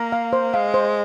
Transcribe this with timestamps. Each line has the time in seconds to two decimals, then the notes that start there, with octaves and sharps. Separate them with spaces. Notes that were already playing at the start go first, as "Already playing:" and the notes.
Already playing: A#3 A#5
0.12 F5
0.33 C5
0.54 G#3 F5
0.74 C5